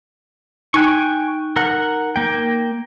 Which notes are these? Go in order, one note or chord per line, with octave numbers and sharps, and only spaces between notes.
D#4 G5 G#5 C#6 F#6
A#4 F#5
A#3 G5